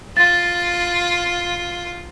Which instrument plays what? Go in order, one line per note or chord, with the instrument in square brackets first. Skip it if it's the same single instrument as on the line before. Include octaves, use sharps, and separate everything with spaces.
[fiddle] F4 [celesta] A6